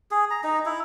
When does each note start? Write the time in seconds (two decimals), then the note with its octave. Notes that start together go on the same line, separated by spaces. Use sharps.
0.11 G#4
0.31 A#5
0.44 D#4
0.66 E4